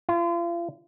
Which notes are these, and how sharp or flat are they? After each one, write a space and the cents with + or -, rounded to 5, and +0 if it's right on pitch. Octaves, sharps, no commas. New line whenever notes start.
F4 -35